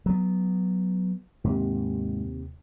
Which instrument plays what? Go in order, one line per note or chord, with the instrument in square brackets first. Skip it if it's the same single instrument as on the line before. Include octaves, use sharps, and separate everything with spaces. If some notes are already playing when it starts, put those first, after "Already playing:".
[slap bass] F#3 B3
[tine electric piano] D#2 C3 [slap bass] G#2